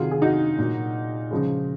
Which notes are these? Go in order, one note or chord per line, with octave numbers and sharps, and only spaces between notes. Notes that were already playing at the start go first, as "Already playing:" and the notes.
Already playing: C3 D#3 F#3 F4 G#4
G#4
D#4 F#4
A#2 F#3
C#3 F3 G#3